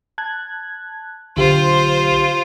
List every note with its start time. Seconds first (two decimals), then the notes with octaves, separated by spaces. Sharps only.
0.18 A5 F#6 G#6
1.37 B1 D3 F4 G4 C5